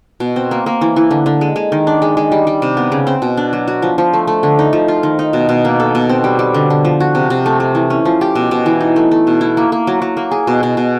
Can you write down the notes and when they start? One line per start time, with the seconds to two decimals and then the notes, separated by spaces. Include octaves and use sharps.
0.20 B2
0.36 C4
0.51 A#3
0.66 A#3
0.81 E3
0.96 E3
1.11 D3
1.26 D3
1.41 G#3
1.56 G#3
1.72 D#3
1.87 D4
2.02 G#3
2.17 G#3
2.32 G3
2.47 G3
2.62 C3
2.77 B3
2.92 C#3
3.07 C4
3.22 B2
3.37 D4
3.53 F#3
3.67 F#4
3.82 F3
3.98 F3
4.13 A3
4.27 A3
4.43 D3
4.59 D#4
4.73 F3
4.88 F4
5.03 D#3
5.19 D#4
5.33 B2
5.49 B2
5.65 A#3
5.80 A4
5.95 B2
6.09 C4
6.24 G3
6.39 G3
6.54 D3
6.70 D3
6.85 F3
7.00 F#4
7.15 C3
7.30 C3
7.46 A3
7.60 A3
7.75 E3
7.90 C#4
8.05 F3
8.21 G4
8.35 B2
8.51 B2
8.66 E3
8.81 D#4
8.96 A3
9.11 A3
9.27 B2
9.41 E4
9.57 A#3
9.72 A#3
9.87 F#3
10.02 F#3
10.17 A#3
10.31 G#4
10.47 B2
10.63 B2
10.77 B2